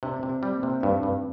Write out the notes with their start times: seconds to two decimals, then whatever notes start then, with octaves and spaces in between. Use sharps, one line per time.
0.03 C3 D4
0.16 C4
0.23 C3
0.29 C4
0.43 G3 C4
0.56 A#3
0.63 C3
0.70 C4
0.81 G2 D4
0.90 C4
1.03 G2